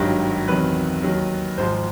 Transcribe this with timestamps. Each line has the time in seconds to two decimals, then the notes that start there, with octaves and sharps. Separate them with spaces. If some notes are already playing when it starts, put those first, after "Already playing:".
Already playing: G#1 G2 D#3 F#3
0.48 E2 C3 D#3 F#3 B4
1.03 D#2 D#3 F#3
1.58 G#1 G#2 F3 C5